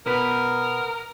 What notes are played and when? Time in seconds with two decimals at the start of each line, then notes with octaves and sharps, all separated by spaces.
0.06 B2 B3 A#4 B4